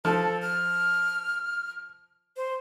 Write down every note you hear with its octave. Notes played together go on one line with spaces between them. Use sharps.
F3 A4
F6
C5